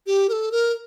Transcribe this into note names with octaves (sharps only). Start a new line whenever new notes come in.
G4
A#4
A4
A#4